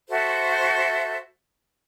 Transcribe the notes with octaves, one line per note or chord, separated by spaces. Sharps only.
F#4 A4 C5 E5